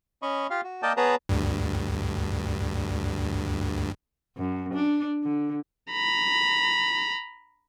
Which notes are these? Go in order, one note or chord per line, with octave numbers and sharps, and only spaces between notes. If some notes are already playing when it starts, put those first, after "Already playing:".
C#4 D#5 B5 C#6
F4 G4 F5
F#4
A#3 A#4 D5 D#5 G5 A5
B3 G#4 B4 C#5 A5 A#5
D2 G2
F#2
D4
D3
A#5 B5